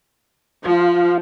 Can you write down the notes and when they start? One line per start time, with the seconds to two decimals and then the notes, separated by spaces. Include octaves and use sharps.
0.66 F3 F4